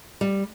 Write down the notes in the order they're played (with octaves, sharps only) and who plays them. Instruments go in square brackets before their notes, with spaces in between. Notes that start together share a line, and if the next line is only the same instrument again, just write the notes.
[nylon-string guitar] G3